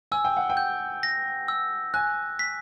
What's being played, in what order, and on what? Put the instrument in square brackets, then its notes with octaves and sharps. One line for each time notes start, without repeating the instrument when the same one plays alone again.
[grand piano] G#5 [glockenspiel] E6
[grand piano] G5
F#5
G5
[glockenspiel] G6
A#6
E6
[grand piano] G#5 [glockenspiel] F#6
[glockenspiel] B6